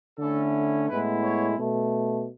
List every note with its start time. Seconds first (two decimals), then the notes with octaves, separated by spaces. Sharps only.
0.18 D3 A3 C#4 E4 A4
0.88 A2 G#3 B3 E4 B4
1.23 C#5
1.59 B2 A3